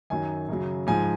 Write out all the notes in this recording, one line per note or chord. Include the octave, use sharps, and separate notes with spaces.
F#2 D#3 F#3 G#5
F#2 C#3 F#3
G#2 F3 G#5